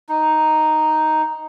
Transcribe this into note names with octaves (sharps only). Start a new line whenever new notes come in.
D#4